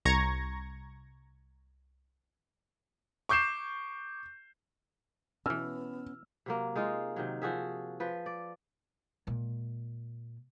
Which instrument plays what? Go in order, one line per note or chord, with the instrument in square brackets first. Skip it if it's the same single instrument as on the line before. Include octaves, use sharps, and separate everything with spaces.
[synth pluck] C2 A#5 C#6 G#6 A#6 C#7
[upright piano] C#6 D6 G6 C7 E7
[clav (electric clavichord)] B2 E3 [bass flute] B3 [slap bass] C#4 [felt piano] E6 F6
[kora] C3 F#3 A#3
G#3 D#4 F4
C3 D#3 F#3
F3 F#4 G#4 E5
F3 B4
D5
[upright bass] A#2 G#3